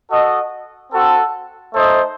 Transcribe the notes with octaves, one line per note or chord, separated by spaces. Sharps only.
F#4 A4 D#5
C4 F#4 A4
A3 D#4 A4 C5 D#5